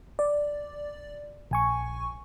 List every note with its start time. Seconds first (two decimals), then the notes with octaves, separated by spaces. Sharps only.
0.19 D5
1.51 A#1 G#5 C#6